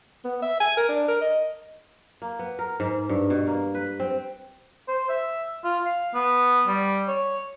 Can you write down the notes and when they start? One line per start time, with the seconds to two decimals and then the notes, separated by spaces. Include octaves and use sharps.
0.24 B3
0.42 E5
0.60 G#5
0.77 A#4
0.89 D4
1.08 A#4
1.21 D#5
2.22 A#3
2.39 B3
2.59 A#4
2.80 G#2
3.09 G2
3.30 B2
3.47 A#3
3.75 B4
4.00 C4
4.88 C5
5.09 E5
5.64 F4
5.85 F5
6.14 B3
6.67 G3
7.08 C#5